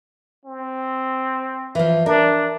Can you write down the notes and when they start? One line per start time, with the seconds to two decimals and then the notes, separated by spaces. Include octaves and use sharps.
0.45 C4
1.75 E3 F3
2.06 D4 A#4